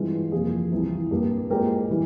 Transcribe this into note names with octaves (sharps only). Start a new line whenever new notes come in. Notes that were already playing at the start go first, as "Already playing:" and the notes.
Already playing: G2 E3 G#3 C4 F4
F2 C3 E3 A#3 F4 G#4
C2 C3 E3
G2 G3 A#3
A#2 G#3 C4 G4 A#4
E3 G3